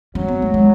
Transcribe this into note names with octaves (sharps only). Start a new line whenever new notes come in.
F#3 C#4
B3
A3
G#3